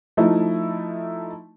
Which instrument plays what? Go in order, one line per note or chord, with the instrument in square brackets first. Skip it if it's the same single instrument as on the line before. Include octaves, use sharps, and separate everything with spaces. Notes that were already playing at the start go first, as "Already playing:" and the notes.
[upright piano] F3 A3 D#4 E4